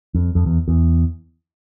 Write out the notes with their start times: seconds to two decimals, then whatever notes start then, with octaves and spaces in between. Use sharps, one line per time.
0.14 F2
0.35 F2
0.46 E2
0.68 E2